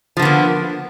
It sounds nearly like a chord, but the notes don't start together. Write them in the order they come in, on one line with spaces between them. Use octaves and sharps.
F3 D3 B3 A#3